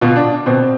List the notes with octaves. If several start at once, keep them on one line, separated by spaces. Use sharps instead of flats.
B2 F4
D4
B2 C4